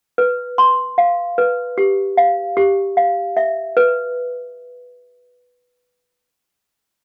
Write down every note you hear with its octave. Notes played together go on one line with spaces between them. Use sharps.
B4
C6
F5
B4
G4
F5
G4
F5
E5
B4